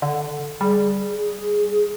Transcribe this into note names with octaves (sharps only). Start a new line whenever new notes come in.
D3
G3 G#4
G#4